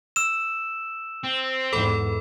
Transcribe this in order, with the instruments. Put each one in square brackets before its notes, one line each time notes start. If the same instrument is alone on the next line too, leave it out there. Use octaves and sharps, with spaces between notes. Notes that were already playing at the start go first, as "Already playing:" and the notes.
[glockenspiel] E6 E7
[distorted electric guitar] C4
[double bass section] E2 G#2 [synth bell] A4 B5